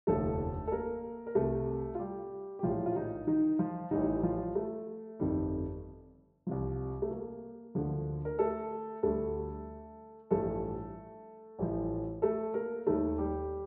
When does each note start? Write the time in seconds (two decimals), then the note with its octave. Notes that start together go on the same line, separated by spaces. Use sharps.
0.07 F1 D#2 D3 F3 A3 A4
0.67 A4
0.72 A#3 A#4
1.27 A#4
1.35 C2 C3 G3 A3 A4
1.95 F4
1.99 G3 G4
2.59 G4
2.63 A#1 A2 F3 F4
2.86 F4
2.95 D#3 D#4
3.27 D#3 D#4
3.59 F3 F4
3.91 A1 A2 D#3 G3 D#4
4.23 F3 F4
4.55 A3
5.20 G1 F2 D#3 G3
6.47 C2 C3 F3
7.02 A3
7.11 A#3
7.75 D2 D3 F3
8.25 A#4
8.39 A3 A4
9.03 D2 D3 G3 A3 A4
10.31 A1 G2 F3 A3 A4
11.59 A1 A2 F3
12.22 A3 A4
12.54 A#3 A#4
12.87 D#2 D#3 G3 A3 A4
13.18 G3 G4